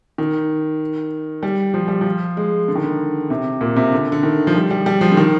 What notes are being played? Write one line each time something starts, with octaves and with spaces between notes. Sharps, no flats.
D#3
G3
F3
G3
F3
G#3
D3
D#3
D3
C3
A#2
C3
D3
D3
D#3
F3
G3
G3
G3
F3
D3
D#3